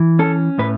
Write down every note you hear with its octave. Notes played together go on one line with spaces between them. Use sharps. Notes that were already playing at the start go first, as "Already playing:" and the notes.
Already playing: E3
C#4 A4
A2 B4